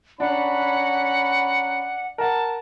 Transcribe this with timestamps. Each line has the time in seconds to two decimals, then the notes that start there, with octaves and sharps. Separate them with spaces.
0.20 C#4 D4 F#5 A#5 B5
2.18 A#4 F#5 A5